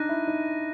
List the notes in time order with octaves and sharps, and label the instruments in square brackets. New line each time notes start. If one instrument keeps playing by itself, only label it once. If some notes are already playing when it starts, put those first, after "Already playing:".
Already playing: [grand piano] D4 D#4 [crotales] F#6 A#6 D#7
[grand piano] E4
D#4